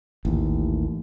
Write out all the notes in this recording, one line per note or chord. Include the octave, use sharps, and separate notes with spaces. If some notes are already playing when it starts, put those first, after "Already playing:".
A1 D#2